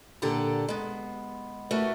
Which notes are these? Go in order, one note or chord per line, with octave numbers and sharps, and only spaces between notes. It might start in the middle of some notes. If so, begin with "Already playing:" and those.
A#2 D3 G4 A4 F#5 A#5
G#3 B3
A3 F#4 G4 A#4 B4